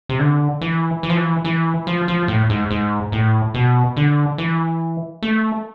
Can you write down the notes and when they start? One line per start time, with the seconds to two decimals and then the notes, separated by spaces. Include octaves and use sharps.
0.09 C3
0.19 D3
0.61 E3
1.03 E3
1.10 F3
1.17 E3
1.45 E3
1.87 F3
2.08 F3
2.28 A2
2.50 G#2
2.71 G#2
3.12 A2
3.54 B2
3.97 D3
4.38 E3
5.23 A3